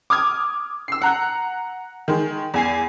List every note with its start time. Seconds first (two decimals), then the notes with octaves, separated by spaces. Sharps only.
0.10 D6 D#6 F6 G#6
0.88 E6 C7
1.02 F#5 A#5 F#6
2.08 D#3 G#3
2.54 E2 G#5 C7